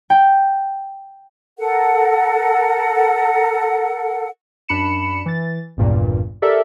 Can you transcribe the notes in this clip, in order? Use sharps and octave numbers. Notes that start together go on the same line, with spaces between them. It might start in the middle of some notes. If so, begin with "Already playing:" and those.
G5
A4 A#4 F#5
F#2 D4 B5 C#7 E7
E3 A6
G#1 E2 G2 A#2
G4 A4 A#4 D5 E5